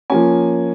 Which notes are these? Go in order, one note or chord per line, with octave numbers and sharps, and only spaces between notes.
F3 A#3 C#4 G#5